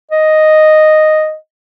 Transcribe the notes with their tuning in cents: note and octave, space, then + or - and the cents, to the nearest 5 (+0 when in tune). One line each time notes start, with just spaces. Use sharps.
D#5 -5